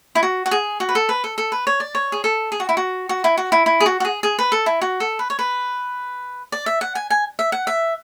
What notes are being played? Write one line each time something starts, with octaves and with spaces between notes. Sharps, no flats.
E4
F#4
F#4
G#4
F#4
B4
A4
B4
A4
A4
B4
C#5
D5
C#5
G#4
A4
G#4
F#4
E4
F#4
F#4
E4
F#4
E4
E4
G#4
F#4
F#4
G#4
G#4
B4
A4
E4
F#4
A4
B4
C#5
B4
D5
E5
F#5
G#5
G#5
E5
F#5
E5